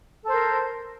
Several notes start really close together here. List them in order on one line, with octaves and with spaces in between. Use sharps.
A4 C5 A#4